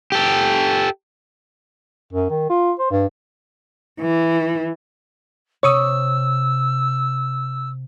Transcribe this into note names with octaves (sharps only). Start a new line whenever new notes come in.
G4 A4
F#2
D#3
F4
C5
G2
E3
C3 C#5 C#6 D#6 E6